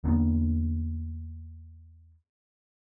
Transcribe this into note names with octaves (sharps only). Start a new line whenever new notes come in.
E2 D3 A#3 B3